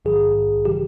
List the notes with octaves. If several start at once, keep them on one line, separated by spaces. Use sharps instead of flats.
A#1 G#2 D#3 F#3 G#4
C#3 E3 G3 G4